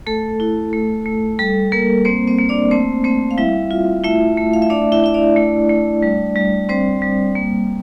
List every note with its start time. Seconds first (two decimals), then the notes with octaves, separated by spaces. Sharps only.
0.07 A3 A4
0.40 E4
0.73 A3
1.06 A3
1.39 G3 A4
1.72 G3 A#3 A#4
2.05 A#3 C4 C5
2.27 C4 C5
2.38 A#3
2.49 D4 D5
2.71 A3 C4 C5
3.04 A3 C4 C5
3.31 F5
3.38 G3 E4 E5
3.71 F4
4.04 A3 E4 E5
4.37 A3
4.53 F5
4.62 E5
4.70 A3 D4 D5
4.92 E4 E5
5.04 E4 E5
5.14 D4 D5
5.36 A3
5.70 A3
6.03 G3
6.36 G3
6.69 G3 C4 C5
7.02 G3
7.35 A#3